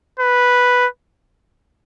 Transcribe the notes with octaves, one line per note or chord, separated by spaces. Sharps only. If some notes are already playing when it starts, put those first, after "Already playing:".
B4